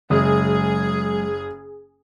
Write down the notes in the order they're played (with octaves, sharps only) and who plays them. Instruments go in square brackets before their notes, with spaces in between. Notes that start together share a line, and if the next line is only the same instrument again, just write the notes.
[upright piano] F#1 [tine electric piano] F#3 G#3 D#6 [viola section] G#4